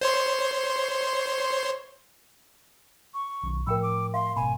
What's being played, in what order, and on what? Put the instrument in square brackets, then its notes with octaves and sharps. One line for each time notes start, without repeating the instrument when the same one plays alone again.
[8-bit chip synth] C5 C#5 C6
[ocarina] C#6
[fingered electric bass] B1 D#3
[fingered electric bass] A2 F3 [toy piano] A#4 G5 B5 [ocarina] E6
[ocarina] D6
[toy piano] F5 [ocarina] C6
[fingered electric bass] G#1 B2 [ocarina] G#5 [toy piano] B5